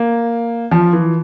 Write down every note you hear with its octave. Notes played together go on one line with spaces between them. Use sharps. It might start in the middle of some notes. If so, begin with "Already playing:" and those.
Already playing: A#3
F3
E3